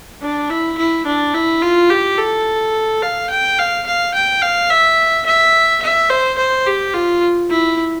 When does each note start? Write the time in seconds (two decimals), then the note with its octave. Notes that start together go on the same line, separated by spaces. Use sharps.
0.22 D4
0.50 E4
0.78 E4
1.06 D4
1.34 E4
1.62 F4
1.90 G4
2.18 A4
3.02 F5
3.30 G5
3.58 F5
3.86 F5
4.14 G5
4.41 F5
4.70 E5
5.26 E5
5.82 E5
6.10 C5
6.38 C5
6.66 G4
6.94 F4
7.50 E4